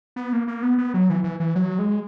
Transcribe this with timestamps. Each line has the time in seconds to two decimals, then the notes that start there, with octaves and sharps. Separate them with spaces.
0.16 B3
0.33 A#3
0.48 A#3
0.63 B3
0.78 B3
0.94 F#3
1.10 E3
1.24 E3
1.40 E3
1.55 F#3
1.79 G#3